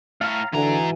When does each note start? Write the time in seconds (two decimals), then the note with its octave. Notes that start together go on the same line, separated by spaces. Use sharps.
0.21 A2 A3 F5 A#5
0.53 G#2 D3 E3 F#4 G#5 A#5